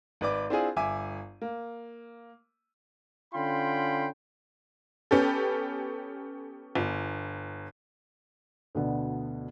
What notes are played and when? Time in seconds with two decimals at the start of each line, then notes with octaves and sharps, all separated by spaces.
0.21 G#1 B4 D5 D6
0.50 C4 D4 E4 F4 G#4 G#5
0.76 G1 E5 G#5 D6
1.41 A#3
3.33 D3 C#4 F4 G5 B5 C6
5.11 B3 C#4 G4 A4
6.75 G1
8.75 D2 B2 D3 B3